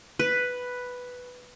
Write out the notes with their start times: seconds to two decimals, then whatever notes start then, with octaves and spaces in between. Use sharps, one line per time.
0.19 B4